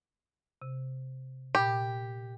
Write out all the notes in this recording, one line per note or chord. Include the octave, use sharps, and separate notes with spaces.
C3
A#2 G4 B5